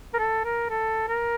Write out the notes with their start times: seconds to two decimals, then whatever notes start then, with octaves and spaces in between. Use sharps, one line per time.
0.14 A#4
0.19 A4
0.44 A#4
0.70 A4
1.08 A#4